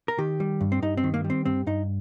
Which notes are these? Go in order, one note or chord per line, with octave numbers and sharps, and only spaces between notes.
A#4
D#3 G4
G3
G2
C4
G2 D#4
C4
D#3
A#3
G3
C4
G2 C4
G2 D#4